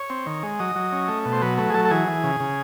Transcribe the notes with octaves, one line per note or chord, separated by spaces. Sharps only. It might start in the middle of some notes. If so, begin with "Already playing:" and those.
Already playing: C#5
C4
D#3
G#3
F#3 D#5
F#3
C#4
A3
B2
C5
F#3 B4
A3 B4
G#4
F#3 A4
A4
E3 G#4
E3
C#3
C#3